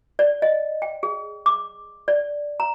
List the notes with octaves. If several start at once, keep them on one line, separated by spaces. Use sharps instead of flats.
D5
D#5
G5
G#4
D6
D5
A#5